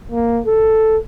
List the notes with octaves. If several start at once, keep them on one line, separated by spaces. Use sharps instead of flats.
A#3
A4